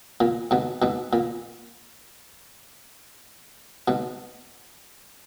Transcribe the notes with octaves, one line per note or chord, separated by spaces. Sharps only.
A#2
G#2 B2
G#2 B2
A#2
G#2 B2